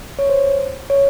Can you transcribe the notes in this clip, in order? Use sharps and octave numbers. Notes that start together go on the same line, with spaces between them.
C#5
C5
C#5